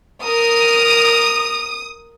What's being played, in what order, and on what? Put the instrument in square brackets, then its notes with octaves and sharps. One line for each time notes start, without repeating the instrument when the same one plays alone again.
[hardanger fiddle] A#4 [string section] D#6